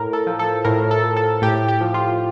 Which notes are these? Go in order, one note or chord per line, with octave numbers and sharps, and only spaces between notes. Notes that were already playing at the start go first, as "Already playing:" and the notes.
Already playing: A2 A#4
A4
F3
A4
A2 A#4
A4
F3
A4
A2 G4
G4
F3
F4